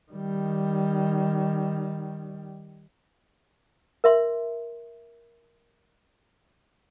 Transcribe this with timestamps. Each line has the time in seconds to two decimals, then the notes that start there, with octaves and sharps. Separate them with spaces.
0.12 D#3 G3
4.04 A#4 E5 C6